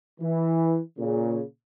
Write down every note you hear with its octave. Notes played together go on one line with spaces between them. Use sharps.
E3
A#2 C#3